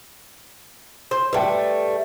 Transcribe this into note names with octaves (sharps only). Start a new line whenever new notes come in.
C5
G3 A3 B4 G5